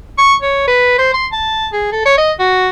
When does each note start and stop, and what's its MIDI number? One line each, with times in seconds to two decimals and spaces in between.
0.18 0.34 85
0.42 0.66 73
0.67 0.98 71
0.98 1.11 72
1.14 1.26 84
1.32 1.67 81
1.73 1.89 68
1.92 2.02 69
2.05 2.14 73
2.18 2.32 75
2.39 2.70 66